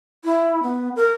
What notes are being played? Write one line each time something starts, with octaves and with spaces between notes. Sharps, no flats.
E4
B3
A#4